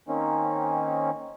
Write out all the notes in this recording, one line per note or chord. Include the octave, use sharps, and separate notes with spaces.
D#3 A#3 C4 C#4 D#4